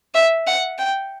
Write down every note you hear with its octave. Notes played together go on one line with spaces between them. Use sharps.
E5
F#5
G5